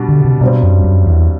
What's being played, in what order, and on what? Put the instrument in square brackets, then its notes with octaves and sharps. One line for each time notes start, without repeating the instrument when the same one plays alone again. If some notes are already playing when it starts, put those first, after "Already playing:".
Already playing: [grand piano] B2 G3 D4
[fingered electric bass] D3
C3
[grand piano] G2 F#3 C4 [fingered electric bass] B2
[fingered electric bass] F#2
F#2
E2